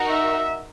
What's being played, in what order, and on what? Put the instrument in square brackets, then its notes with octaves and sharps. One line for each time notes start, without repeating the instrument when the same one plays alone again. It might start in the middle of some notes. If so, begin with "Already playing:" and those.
Already playing: [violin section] D#4 F#4 A#4
[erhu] E5